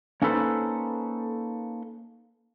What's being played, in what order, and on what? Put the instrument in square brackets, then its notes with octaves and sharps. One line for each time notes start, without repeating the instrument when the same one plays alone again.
[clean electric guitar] A#3 C#4 D#4 A4 B4 C5